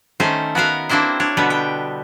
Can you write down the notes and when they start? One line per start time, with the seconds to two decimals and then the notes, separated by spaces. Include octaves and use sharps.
0.20 D#3 A3 C#4 C5
0.55 B3 F#4 A#4 F5
0.89 A#3 C4 D4 E4 C5
1.20 D4 C#5
1.37 B2 D3 G3 B3
1.50 G5